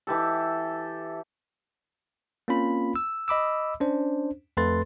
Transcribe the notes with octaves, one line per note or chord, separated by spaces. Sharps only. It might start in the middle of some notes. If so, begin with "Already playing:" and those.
E3 G4 A4
A#3 C4 C#4 F4 B5
E6
D#5 B5 D6 E6
C#4 D4 C5
F2 A3 A4 B4 C6 A6